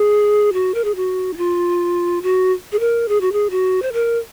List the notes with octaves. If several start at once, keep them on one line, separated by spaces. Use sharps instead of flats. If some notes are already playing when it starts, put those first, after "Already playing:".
Already playing: G#4
F#4
A#4
G#4
F#4
D#4
F4
F#4
G#4
A#4
G#4
F#4
G#4
F#4
C5
A#4